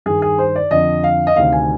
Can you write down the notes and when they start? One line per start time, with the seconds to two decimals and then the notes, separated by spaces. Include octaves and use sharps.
0.06 G2 D#3 G#4
0.22 G#4
0.39 C5
0.56 D5
0.71 F2 D3 D#5
1.04 F5
1.27 D#5
1.36 D2 C3 D#3 F5
1.53 G#5